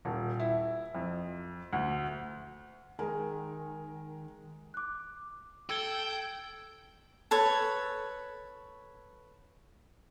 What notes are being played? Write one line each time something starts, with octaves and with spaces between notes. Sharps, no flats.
D#1
E4
F2
D2
D#3 G#3 A#4 G#5
D6 F#6
A4 G5 E6 G#6 G7
A4 B4 C#5